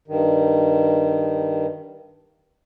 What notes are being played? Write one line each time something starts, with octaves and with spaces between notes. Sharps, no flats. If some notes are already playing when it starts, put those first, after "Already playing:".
G2 D#3